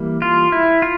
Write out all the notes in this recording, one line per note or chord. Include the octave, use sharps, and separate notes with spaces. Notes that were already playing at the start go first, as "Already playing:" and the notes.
Already playing: E3 G3 A#3
F4
E4
F4